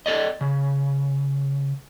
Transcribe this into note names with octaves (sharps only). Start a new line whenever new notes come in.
A4 D5 D#5
C#3